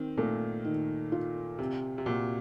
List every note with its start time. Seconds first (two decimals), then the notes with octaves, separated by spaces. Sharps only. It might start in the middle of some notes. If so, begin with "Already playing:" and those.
Already playing: D#3 C4
0.17 A#2 A3
0.65 D#3
1.12 F4
1.59 C3 C4
1.98 C3
2.06 A#2 F#4